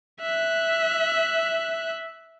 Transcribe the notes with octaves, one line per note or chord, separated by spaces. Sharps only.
E5 F#6